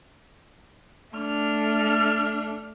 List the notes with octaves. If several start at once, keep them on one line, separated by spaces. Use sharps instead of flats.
A3 D4 F6